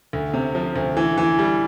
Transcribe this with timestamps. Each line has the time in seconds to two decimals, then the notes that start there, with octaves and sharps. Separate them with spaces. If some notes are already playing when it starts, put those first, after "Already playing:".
0.13 D2
0.34 C3
0.55 F3
0.76 D2
0.97 E3
1.18 E3
1.39 G3